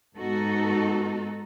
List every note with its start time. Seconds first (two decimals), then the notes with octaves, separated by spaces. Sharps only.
0.16 G#2 B3 D#4 F#4 A4